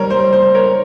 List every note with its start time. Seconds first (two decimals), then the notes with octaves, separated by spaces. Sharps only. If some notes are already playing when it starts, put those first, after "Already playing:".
Already playing: G3 A#4 C5 C#5
0.10 C5
0.33 C5
0.55 A#4 C#5